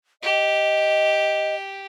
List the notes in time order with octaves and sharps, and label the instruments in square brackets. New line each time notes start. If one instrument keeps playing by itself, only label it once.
[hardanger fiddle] G4 [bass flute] D#5